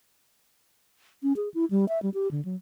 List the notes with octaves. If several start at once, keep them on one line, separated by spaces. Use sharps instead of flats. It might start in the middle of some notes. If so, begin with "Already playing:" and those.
C#4
G#4
E4
G3
E5
G3
G4
D3
F#3